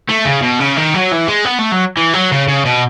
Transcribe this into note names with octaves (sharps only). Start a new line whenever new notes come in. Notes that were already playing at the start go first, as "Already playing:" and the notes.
A3
C#3
B2
C#3
D#3
F#3
E3
G#3
B3
A3
F#3
E3
F#3
C#3
C#3
B2